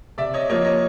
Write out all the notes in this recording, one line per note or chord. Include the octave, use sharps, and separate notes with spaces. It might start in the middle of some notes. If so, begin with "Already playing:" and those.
C3 D5 E5
C#5 D#5
F3 A#3 C#5 D#5
C#5 D#5